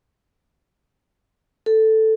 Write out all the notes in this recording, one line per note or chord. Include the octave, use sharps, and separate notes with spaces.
A4